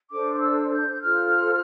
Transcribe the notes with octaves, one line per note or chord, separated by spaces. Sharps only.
D4 A4 C5 D6
D6
E6
G6
G6
F4 A4 C5 F6